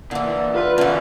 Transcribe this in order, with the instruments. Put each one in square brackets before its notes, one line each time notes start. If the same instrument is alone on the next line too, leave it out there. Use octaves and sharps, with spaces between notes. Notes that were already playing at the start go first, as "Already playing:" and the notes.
[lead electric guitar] A#2 [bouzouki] D3 E3
[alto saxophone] F4 [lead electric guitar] B4
[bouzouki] D3 E3 [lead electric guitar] C#4 F#4